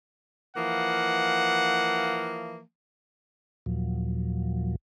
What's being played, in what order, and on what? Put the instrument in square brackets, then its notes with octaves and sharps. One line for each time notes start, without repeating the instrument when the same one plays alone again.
[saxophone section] E3 F3 A#3 [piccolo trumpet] F#5
[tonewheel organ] D#2 A#2 F3 F#3